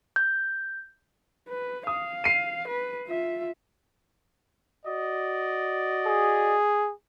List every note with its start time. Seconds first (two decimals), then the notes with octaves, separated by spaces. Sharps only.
0.16 G6
1.48 B4
1.87 F5 D#6
2.24 C7 D#7
2.68 B4
3.07 F4 E5
4.85 F#4 D5 D#5
6.06 G#4